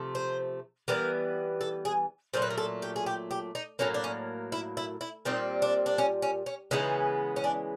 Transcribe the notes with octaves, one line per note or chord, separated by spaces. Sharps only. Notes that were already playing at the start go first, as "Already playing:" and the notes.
Already playing: C3 F3 A3
C5
E3 G3 B3 A#4
A4
G#4
A#2 F#3 A3 C5
B4
A#4
A4
G4
G#4
G4
G4
D#4
A2 F#3 A#3 C#4
D4
C#4
E4
E4
E4
A#2 G3 C4 D#4
D4
D4
C#4
C#4
C#4
C#3 E3 G#3 B3 D#4
C#4
D4